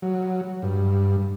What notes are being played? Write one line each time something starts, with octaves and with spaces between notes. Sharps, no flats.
F#3
G2